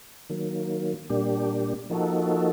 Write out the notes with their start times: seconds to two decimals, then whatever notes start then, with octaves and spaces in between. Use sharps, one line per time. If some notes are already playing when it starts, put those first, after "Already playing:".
0.30 D#3 F#3 A#3
1.10 A#2 G3 A#3 D4 G4
1.90 F3 A#3 D#4 F#4 A4